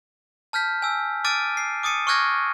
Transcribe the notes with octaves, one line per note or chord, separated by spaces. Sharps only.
A5 F6 G6 B6
G#5 E6
D6 F6 A6 D7 D#7
C7
D6 D#6 A6 C#7 D#7
C#6 D6 F6 F#6 G#6 A#6